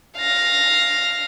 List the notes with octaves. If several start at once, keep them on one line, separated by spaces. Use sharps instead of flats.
F5 A#6